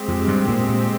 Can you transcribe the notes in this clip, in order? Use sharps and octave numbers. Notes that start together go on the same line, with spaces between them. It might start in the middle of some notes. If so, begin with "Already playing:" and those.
Already playing: G#3 C4 G4
F2 F3
G2 G3
A#2 A#3
A#2 A#3